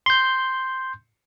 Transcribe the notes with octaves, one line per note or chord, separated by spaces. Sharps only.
C6 G6